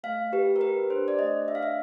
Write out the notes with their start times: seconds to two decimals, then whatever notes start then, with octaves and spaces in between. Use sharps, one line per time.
0.03 A3 F5
0.32 G4 B4
0.56 A#4
0.61 G4 B4
0.90 D4 C5
1.08 D5
1.19 A3 D#5
1.47 D4 E5
1.55 F5
1.63 E5